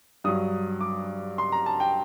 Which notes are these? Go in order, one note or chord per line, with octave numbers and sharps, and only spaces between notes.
G2 F#3 D#6
D6
C6
A#5
A5
G5